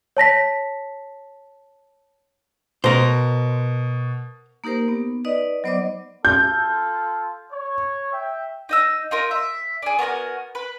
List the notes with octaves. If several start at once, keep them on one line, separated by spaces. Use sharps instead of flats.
C#5 A5 A#6 B6
B2 A#4 C5
A#3 D#4 G4 A#4 C5
B3
D#4 B4 D5 D#5
F#3 B3 C5 D5 D#5 D6
F4 A4 G6
C#5
E5 G5
D#4 D#5 E6
D#4 F4 A#4
E5
D4 G#4
B3 F#4 A#4 G#5
B4